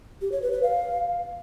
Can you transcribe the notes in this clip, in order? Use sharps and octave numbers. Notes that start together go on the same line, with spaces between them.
G4
C#5
B4
B4
F5